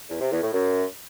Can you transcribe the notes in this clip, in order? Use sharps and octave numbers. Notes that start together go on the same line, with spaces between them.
E2
C3
E2
A2
F#2